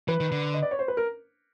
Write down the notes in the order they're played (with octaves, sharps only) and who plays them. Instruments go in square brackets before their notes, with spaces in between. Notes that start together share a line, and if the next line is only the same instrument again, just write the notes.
[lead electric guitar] E3 [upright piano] B4
[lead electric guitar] D#3
D3
[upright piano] D#5
D5
C#5
C5
B4
A#4